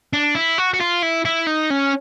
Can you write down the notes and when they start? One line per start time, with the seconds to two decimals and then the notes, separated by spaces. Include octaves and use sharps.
0.13 D4
0.35 E4
0.58 F#4
0.74 F#4
0.81 F4
1.03 E4
1.25 E4
1.47 D#4
1.70 C#4